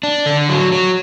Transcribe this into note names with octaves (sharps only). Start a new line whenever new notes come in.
D4
D3
F#3
F#3